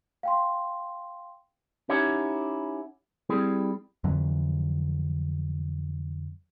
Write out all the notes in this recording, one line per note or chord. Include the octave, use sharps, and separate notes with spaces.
F5 G5 C6
C#4 D#4 E4 G4 C#5 F#5
G3 C4 E4 G#4
F2 D3 E3 F#3